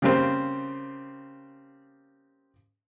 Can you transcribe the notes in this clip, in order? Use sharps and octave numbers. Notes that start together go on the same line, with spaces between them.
C#3 G3 A#3 C4